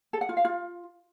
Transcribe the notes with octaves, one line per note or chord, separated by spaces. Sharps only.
A4
F#5
F4
F5
F4